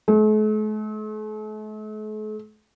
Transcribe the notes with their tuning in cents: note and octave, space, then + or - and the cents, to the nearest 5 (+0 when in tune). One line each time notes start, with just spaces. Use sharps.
A3 -45